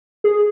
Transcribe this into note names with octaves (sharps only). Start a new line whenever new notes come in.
G#4